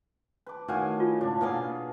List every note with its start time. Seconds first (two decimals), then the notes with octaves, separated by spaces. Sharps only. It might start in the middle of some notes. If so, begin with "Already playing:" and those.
0.46 B4 D6
0.68 A2 D#3 F#4 F5 G#5
1.00 F4
1.21 G#2 C#3 D4
1.41 B2 A#3 B3 G#4 F5